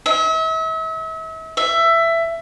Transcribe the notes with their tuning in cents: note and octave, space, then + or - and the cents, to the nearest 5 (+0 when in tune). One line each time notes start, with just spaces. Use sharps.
E5 -40
E5 +15